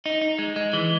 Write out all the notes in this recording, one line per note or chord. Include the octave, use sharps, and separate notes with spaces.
D#4
D#4
G#3
G#3
E3